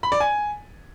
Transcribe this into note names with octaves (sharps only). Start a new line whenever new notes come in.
B5
D5
G#5